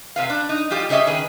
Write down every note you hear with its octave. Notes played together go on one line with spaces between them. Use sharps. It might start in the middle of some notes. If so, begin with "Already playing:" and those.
C3 B4 F5
D4
D#4
G3 F4 G4 D#5
C#3 G4 C#5 D#5 E5
D#3 G#4 B4